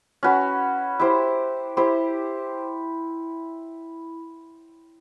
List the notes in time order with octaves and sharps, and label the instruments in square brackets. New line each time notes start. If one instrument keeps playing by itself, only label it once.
[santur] C#4 F#4 B4
E4 G4 C5
E4 G4 C5